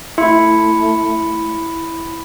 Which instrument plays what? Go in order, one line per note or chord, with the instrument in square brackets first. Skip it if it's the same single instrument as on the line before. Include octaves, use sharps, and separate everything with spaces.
[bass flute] A3 [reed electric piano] E4 [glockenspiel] B5 C6 C#7